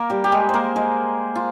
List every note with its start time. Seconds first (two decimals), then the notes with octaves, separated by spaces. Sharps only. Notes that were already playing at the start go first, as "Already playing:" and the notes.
Already playing: A#3 A#4
0.10 G3 G4
0.24 G4
0.32 G#3 G#4
0.49 A#3 A#4 C5
0.76 G#3 G#4
1.35 F4